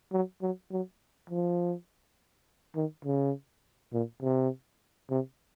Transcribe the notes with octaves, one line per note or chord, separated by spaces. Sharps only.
F#3
F#3
F#3
F3
D#3
C#3
A#2
C3
C3